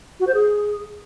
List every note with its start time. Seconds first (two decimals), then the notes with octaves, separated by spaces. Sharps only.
0.20 F#4
0.27 C5
0.34 G#4